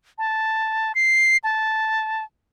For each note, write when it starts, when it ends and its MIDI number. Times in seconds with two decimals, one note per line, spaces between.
0.18 0.92 81
0.95 1.37 96
1.44 2.24 81